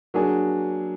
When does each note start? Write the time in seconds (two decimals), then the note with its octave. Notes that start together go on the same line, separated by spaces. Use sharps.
0.14 F#3 A#3 D4 G#4